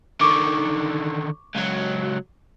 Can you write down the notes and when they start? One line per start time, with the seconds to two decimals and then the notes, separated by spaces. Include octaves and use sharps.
0.21 D3 D#3 C#6 D6
1.55 C#2 F#3